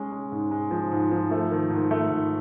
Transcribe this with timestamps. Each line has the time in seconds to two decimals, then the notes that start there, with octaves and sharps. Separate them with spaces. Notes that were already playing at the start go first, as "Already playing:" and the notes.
Already playing: G#3 C#4
0.12 G#3
0.32 G#2
0.51 G#3
0.71 F3
0.92 G#2
1.12 F3
1.31 A3
1.51 D#3
1.70 G#2
1.91 A3
2.10 G#2